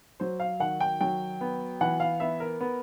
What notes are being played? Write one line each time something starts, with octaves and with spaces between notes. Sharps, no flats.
F#3 C5
F5
D#3 F#5
G5
F#3 G5
B3
E3 F#5
F5
B3 E5
A#4
B3